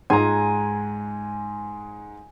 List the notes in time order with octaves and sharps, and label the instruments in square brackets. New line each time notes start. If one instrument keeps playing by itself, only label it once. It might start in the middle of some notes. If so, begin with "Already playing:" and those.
[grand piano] G#2 G#3 C6 [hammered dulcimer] G#5 A#5